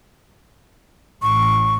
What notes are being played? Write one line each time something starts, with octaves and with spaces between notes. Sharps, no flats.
A1 C#6